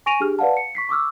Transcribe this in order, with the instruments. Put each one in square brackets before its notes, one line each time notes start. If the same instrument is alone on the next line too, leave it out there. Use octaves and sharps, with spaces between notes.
[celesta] G#5 C#6 A#6 D7 D#7 F7
D4 G4 G#4 F6
B4 D5 F5 F#5 A5
C#7
C#6 B6 C7
C#6 D6 E6 F6